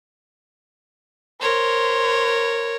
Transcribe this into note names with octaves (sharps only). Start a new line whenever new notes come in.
A#4 C5 C#5